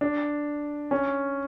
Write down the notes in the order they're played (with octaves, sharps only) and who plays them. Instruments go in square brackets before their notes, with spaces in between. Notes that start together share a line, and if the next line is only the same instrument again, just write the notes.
[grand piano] D4
C#4